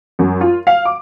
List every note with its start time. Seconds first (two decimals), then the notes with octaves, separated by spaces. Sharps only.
0.19 F#2
0.41 F4
0.67 F5
0.85 D6